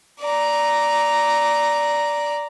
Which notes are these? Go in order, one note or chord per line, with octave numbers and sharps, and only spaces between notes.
D5 A#5